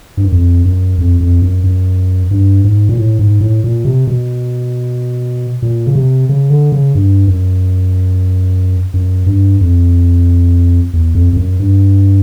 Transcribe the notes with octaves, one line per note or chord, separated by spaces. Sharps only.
G2
F#2
F2
F#2
F2
F2
F#2
F#2
G2
G#2
A#2
A2
G#2
A2
A#2
C3
B2
A#2
C#3
C3
C#3
D3
C#3
G2
F#2
F#2
G2
F2
E2
F2
F2
F#2
G2